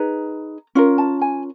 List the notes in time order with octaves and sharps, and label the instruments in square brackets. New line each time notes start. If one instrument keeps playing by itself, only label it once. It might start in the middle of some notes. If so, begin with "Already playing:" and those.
Already playing: [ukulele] D#4 G#4 B4 A#5
C#4 F4 A#4
A5
G#5